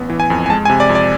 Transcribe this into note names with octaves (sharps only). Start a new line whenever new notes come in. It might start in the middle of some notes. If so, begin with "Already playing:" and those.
Already playing: A1 B3
E3
G#5
F2
G#5
G#3 A5
G#5
C3
D5
F2
D5